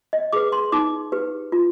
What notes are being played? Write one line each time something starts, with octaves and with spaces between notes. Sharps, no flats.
D#5
G#4 B4 D6
C6
D#4 D6
G4 B4
F4